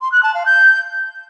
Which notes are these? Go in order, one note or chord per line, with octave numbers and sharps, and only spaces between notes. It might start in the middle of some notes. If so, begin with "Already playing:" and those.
C6
F#6
A5
F5
G6